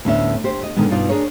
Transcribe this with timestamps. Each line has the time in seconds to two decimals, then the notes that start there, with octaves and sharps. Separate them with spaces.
0.05 D2 A2 B3 C#4 E5
0.44 G4 C5
0.63 D#5
0.76 A#2 D3 D#3 G#3 B3
0.89 G2 B2 D#4 F4 D5
1.09 D4 G#4 A#4 C#5